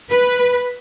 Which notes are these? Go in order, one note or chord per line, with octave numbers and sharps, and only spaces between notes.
B4